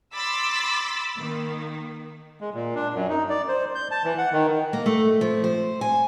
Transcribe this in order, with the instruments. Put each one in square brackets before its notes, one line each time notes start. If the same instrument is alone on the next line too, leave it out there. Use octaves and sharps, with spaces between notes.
[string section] B5 C6 D6 E6 A6 B6
D#3 A#3
[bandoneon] G#3
A#2
D4
F#2
D#4
D5
C5
G6
A5
E3
F#5
D#3
[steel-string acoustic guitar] A#3
A3
F3
C5
G#5